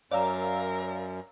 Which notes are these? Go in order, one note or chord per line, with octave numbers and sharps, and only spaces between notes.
F#2 A#4 C#5 D5 F5 A#5 E6